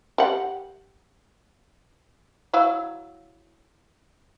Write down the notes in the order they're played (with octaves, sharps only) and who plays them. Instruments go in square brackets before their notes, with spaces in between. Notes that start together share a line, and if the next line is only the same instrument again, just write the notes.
[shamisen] G4 F#5
F#3 E4 F5